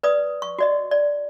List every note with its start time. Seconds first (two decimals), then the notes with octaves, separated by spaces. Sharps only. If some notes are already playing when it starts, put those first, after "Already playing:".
0.03 B4 D5 D#6
0.42 C#6
0.59 F#4 D5 D#5
0.91 D5